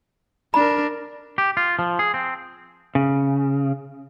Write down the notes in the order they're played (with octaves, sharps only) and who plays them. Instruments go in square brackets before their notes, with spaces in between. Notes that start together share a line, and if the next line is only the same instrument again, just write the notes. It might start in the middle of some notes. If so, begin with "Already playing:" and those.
[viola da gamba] D4 A#4 [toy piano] B5
[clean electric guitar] G4
F4
F3
G#4
C4
[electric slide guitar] C#3